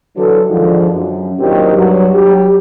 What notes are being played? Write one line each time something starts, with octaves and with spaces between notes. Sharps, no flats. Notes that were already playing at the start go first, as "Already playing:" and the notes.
D3 E3 F#3 A4
G#2 D3 D#3 F3
F#2
A#2 D#3 F#3 C4 D4 G4
G2 F#3
F#3 G4